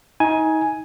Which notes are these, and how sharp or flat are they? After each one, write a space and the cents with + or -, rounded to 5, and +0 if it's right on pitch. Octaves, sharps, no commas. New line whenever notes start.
D#4 +30 G#5 +5